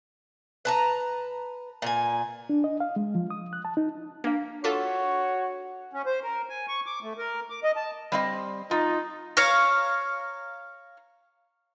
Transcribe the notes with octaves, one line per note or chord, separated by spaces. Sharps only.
B4 A5 A#5
A#2 G#5
D4
D#5
F5
G#3
F3
D#6
F#6
A5
D#4
A#3 D4 F5
F4 F#4 A4 C#5 D6 B6
C#4
C5
A#4
G#5
C#6
D6
A3
A#4
D6
D#5
A5
G3 C4 D#5
D#4 F4
C#5 F5 A#5